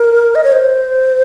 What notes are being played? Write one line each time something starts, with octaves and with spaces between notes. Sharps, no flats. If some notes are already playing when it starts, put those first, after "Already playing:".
Already playing: A#4
D#5
C#5
C5